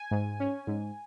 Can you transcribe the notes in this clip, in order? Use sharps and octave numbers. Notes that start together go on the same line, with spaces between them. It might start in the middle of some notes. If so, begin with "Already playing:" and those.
Already playing: G#5
G#2
C#4
G#2